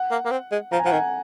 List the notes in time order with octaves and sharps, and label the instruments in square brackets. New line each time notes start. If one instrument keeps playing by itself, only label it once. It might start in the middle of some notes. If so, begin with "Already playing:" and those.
Already playing: [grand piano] F#5
[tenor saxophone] A#3
A#3
C4
G#3
[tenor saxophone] F3 [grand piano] A#5
[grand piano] G#5
[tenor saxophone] F3 [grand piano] F#5
[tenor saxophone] D#3 [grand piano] G#5